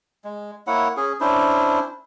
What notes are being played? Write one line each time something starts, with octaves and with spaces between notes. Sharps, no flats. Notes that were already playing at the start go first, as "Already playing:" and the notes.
G#3
A#3 E4 C#5 F#5
C#4 G#4
C#4 D4 E4 C5